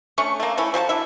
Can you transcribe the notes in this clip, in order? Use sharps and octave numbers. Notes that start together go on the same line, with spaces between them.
A3 C#4 D4 C#6
A3 A#3
A3 C#4 E4
F3 F#4 G#4 A5
D4 E4 E5